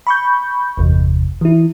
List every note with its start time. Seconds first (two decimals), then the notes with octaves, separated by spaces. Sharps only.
0.07 B5 C#6 G6
0.77 G1 E2 C3
1.41 E3 E4